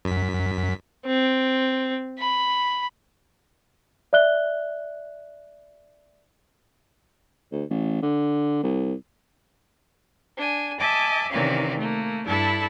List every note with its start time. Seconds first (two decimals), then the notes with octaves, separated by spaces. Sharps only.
0.05 F#2 B6
1.06 C4
2.19 B5
4.13 D5 E5 F#6 G7
7.52 D2
7.70 A1
8.02 D3
8.63 C2
10.38 D4 G#5
10.79 D#5 E5 G#5 A5 D6
11.31 C3 D#3 E3 C#4 D5 F5
11.78 A3 A#3
12.26 G2 D4 E4 A4 A5 B5